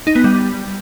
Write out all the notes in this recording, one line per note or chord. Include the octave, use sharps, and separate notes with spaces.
D#4
B3
G3